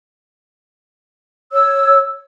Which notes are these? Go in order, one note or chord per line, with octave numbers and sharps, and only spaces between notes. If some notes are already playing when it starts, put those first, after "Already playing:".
C#5 E6